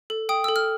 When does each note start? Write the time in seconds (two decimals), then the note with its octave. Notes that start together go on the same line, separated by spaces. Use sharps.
0.10 A4
0.29 G5 D#6
0.44 A4 E6
0.56 F6